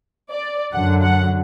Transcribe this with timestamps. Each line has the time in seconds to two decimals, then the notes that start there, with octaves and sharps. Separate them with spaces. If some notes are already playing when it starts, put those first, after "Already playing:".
0.30 D5
0.73 F#2 D3 F#3 F#5
1.02 F#5